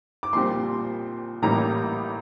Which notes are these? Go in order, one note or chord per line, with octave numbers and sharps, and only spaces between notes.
D6
A#1 A#2 G3 C4 C6
A1 A2 G3 A#3 A#5